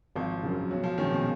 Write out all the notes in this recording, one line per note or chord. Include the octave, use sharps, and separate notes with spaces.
G#1 F3
F#2 C#3
B1 F#3
F3
A#2 D#3 G#3 C#4
B2